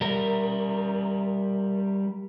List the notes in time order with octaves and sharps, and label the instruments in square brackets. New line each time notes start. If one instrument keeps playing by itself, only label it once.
[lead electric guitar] G3 A#4